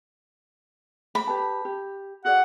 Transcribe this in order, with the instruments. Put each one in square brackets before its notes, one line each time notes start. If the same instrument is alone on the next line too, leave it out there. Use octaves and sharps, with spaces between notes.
[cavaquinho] B5
[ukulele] G4 B4 A5
G4
[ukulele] F#4 G#4 D5 [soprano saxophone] F#5